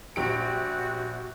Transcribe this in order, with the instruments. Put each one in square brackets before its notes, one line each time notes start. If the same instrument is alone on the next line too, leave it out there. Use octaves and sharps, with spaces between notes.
[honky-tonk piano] A#1 G4 D7 [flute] F#4